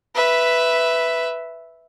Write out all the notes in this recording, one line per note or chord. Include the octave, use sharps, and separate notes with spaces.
B4 E5